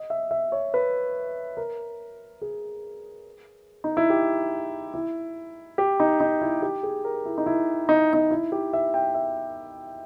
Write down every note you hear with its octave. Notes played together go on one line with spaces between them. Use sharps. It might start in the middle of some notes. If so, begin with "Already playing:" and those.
Already playing: D#5
E5
E5
C#5
B4
A#4
G#4
D#4
E4
G4
E4
G4
D#4
D#4
E4
G4
G#4
A#4
E4
D#4
E4
D#4
D#4
E4
G4
E5
G5
E5